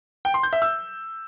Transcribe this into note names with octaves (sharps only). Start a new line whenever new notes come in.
G5
C6
G6
E5
E6